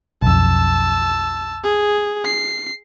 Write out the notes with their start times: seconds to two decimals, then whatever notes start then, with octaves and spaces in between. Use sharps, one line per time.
0.22 B1 F2 A5 E6
1.64 G#4
2.24 C7